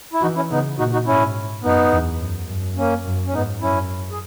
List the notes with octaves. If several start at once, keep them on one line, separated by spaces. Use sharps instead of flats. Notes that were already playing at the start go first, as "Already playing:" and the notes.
E4
E3 D#4 F#4
C#4 E4
C#3 B3 D#4
A#2 D#4 F#4
D#4 F#4
G#2 C#4 E4
F#2 B3 D#4
E2
F#2
F#2
A#3 C#4
F#2
C#4
G#2 B3 D#4
F#2 C#4 E4
G#4